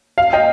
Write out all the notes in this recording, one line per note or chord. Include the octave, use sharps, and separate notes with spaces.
F5
D#5 G5